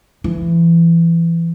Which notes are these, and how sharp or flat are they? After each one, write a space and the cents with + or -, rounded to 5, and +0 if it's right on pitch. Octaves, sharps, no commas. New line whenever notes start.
E3 +25